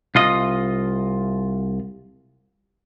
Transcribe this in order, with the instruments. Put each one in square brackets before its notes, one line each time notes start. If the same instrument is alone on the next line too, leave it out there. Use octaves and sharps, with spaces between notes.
[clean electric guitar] C2 F4 D#5